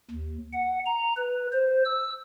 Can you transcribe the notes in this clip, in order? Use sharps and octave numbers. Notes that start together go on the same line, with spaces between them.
D#2
F#5
A#5
B4
C5
E6